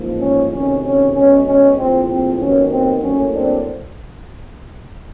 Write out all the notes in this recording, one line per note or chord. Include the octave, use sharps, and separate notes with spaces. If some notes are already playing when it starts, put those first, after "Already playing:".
Already playing: A1 G#2 F3 A#3
C#4
D2 C3 D#3 C#4
C#4
B1 B2 G#3 C#4
C#4
A#1 A2 F3 C4
C4
D#2 D#3 F#3 B3 C#4
C4
A2 F#3 A#3 C#4
C4 D4